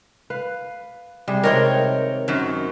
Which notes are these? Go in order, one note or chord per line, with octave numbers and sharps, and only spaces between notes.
B4 F5
C3 G3 G#4
C3 D#3 G#3 A#4 C#5 G5
F#2 D#3